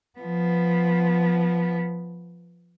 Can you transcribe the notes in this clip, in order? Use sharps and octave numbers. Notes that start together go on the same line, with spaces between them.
F3 B3